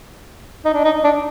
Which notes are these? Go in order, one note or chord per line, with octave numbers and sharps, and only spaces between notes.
D#4
D4
D#4
D4